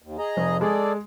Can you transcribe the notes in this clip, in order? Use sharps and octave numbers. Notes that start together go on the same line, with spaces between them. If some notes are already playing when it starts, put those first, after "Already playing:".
D#2
G#4 D#5 A#5
F1
G#3 G#4 A4 D5